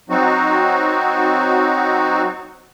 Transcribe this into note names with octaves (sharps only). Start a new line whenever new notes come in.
F#3 C4 D#4 F#4